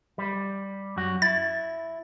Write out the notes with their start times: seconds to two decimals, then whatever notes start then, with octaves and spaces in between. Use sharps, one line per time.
0.18 G3
0.96 F#2 F#4
1.22 E4 A6